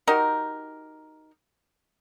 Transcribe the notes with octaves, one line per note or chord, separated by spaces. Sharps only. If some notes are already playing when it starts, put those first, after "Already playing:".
D#4 F#4 G4 A#4